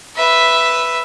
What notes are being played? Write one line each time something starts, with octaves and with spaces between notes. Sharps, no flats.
B4 E5